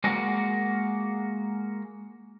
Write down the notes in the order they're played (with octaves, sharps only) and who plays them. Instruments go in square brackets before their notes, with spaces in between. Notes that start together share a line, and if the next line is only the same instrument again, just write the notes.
[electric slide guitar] G#3 A#3 F#4 A#4